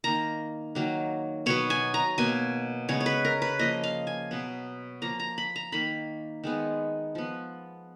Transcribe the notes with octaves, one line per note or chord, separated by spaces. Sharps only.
D#3 A#3 A#5
D#3 F#3 A#3
B2 F#3 B3 C#5
G#5
A#5
B2 A#3 G#5
C#3 G#3 B3 C#5
C#5
B4
A#4
B4
F3 A#3 D#5
F5
G#5
B2 F#3 B3
F3 A#3 A#5
A#5
B5
A#5
D#3 A#3 B5
D#3 G#3 B3
F3 B3